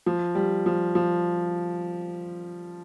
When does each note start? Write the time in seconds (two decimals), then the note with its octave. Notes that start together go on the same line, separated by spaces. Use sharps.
0.06 F3
0.35 G3
0.66 F3
0.95 F3